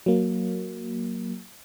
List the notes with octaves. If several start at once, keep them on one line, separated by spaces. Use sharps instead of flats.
F#3 A#3